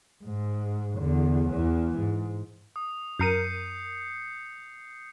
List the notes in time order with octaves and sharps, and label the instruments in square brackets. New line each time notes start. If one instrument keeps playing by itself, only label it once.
[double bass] G#2
E2 D3
E2 E3
G#2
[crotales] D#6
[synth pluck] F#2 A#4 D#7 [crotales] G6 C7 C#7